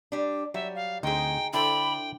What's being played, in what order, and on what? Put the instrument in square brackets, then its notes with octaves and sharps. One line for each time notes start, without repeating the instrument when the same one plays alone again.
[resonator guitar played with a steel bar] G3 D4
[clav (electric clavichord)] F#3 [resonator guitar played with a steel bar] G3 [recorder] E5
[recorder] F5
[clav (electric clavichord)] D2 C4 [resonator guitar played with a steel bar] D#4 G#4 [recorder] G5
[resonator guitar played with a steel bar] D3 [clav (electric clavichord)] E4 A4 C5 [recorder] G5 [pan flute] B5